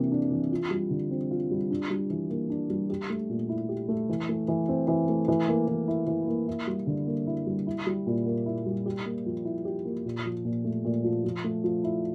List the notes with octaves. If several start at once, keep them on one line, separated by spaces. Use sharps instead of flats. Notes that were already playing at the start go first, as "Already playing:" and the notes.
Already playing: C3 E3 A#3 D4
D4
E3
F4
G3
D3
C4
F4
G3
D4
G3
E3
A#3
D4
G3
G4
A3
A#2
E4
G4
A3
E3
A3
E3
C4
E3
A3
E3
A#3
E3
E4
E3
A#3
E4
G3
D3
A#3
E4
G3
E4
G3
A#2
A#3
E4
G3
G4
A#3
F3
E4
G4
A#3
A#2
F3
A#2
A3
A#2
F3
F3
A3
F3
E4